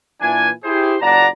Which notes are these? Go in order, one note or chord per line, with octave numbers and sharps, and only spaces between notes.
A#2 E3 D4 G#5
E4 G4 G#4 C5
F#1 A#2 D5 F#5 A5 A#5